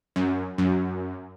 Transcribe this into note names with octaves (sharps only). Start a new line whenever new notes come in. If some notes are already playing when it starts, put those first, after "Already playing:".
F#2
F#2